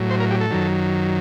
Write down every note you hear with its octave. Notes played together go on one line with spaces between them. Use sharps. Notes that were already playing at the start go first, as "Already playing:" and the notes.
Already playing: A2 F#3
C5
A#4
G4
A4
F#2 D#3 F#3